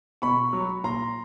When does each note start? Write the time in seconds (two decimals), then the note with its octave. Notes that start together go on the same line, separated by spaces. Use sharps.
0.22 B2 B5 C#6
0.53 F#3
0.84 A#2 A#5 C6